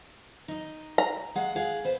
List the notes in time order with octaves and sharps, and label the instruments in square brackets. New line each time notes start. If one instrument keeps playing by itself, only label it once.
[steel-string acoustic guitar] D#4 D#5
[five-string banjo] A#5
[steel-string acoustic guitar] G#3 F5 F#5
G#4 F5 F#5
B3 C5